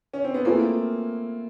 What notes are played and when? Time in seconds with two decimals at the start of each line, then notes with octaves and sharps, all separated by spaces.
0.13 C#4
0.24 C4
0.34 B3
0.45 A3 A#3 C4 F4 G#4 B4